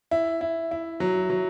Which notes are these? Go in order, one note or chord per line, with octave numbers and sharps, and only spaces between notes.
E4
E4
E4
F#3
F#3